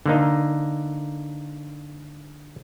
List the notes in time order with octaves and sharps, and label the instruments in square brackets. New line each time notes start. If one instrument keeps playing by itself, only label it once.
[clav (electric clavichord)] D3 A#3 D#4